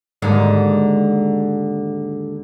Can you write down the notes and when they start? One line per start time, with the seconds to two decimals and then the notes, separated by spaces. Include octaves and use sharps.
0.22 D#2 G#2 D3